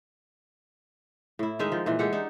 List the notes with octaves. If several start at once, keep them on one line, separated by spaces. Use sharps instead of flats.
A2 E4
D#3 G#3 D#4 E5
F3
A#2 E3
G#3 G4 A4 F#5
D4 D#4